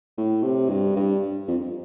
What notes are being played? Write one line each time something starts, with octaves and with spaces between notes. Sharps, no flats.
A2
C3
G2
G2
F2